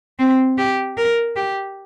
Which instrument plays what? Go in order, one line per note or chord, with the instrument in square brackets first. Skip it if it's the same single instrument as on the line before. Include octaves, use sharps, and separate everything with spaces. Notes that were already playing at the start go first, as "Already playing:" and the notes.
[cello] C4
G4
A#4
G4